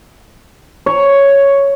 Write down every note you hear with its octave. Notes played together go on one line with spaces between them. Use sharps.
C#5